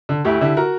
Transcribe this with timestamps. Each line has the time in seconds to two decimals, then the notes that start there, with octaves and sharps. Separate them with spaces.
0.09 D3
0.25 D2 E4 G4
0.41 D3 E4 G4
0.57 F#4 A#4